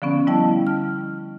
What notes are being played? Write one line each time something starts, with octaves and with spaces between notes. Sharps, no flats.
D3 F3 B3 C#4
G3 E4 D#5 G5 A5
F6